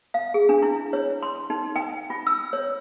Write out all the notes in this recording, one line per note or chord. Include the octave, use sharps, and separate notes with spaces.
F5
G#4
D4
E4
C#5
C6
D#4
G5
F4
E6
C#5